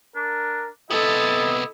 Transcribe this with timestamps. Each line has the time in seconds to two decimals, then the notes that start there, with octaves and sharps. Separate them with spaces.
0.16 D4 A#4
0.90 C3 B3 E4 A4 D#5 A6